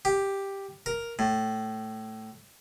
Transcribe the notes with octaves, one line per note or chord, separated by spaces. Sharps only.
G4
A#4
A2